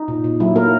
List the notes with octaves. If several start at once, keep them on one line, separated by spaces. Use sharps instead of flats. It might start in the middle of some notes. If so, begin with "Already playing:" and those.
Already playing: D#4
A#2
A#2
F#3 E4
A#3 A#4